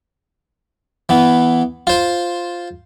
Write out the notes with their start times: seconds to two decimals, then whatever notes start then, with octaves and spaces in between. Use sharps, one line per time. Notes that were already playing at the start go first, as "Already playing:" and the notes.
1.09 E3 B3
1.87 F4 C5